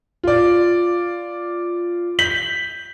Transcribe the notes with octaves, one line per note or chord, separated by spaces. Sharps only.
F4 D5
G6 B6 F#7